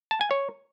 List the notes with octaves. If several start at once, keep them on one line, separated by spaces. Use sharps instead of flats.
A5
G#5
C#5